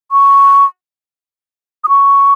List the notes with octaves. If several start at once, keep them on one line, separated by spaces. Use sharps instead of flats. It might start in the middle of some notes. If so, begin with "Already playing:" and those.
C#6
D#6
C#6